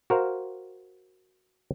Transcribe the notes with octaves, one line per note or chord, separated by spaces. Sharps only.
F#4 A#4 C5 F5